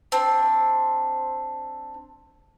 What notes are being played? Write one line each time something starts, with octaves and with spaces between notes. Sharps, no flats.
C4 D4